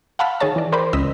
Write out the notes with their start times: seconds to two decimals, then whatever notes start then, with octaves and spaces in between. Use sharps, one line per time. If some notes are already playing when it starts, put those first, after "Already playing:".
0.19 F5 F#5 A5 B5 E6 F6
0.40 D#3 G#4 C#5 A5
0.56 E3 D5
0.72 A#4 C5 D5 G5 B5 D6
0.93 C#2 D#5 E6 B6